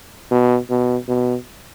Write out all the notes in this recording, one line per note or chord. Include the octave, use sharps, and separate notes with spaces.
B2
B2
B2